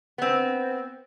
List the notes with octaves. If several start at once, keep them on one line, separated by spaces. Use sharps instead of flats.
B3 C4